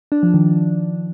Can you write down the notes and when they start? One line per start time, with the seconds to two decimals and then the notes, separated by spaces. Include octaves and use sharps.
0.12 D4
0.23 F3
0.34 D#3